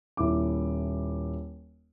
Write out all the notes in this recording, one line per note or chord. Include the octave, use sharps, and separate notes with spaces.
D#1 E4 D6